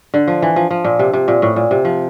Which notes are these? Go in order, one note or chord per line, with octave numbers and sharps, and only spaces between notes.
D3
F3
E3
F3
F3
A#2
C3
C3
A#2
A2
A#2
C3
F3